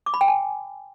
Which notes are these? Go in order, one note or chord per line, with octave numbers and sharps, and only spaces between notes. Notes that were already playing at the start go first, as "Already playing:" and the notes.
D6
B5
G5
G#5